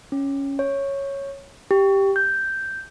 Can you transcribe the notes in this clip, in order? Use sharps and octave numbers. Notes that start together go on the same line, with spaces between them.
C#4
C#5
G4
G6